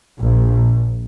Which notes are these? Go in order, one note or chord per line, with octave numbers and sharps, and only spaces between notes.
A#1